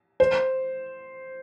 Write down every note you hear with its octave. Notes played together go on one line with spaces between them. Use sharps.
C5